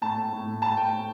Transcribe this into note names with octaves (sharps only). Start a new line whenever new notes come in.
A2 A5
A2
A2
A2
A2 A5
A2 G5
A2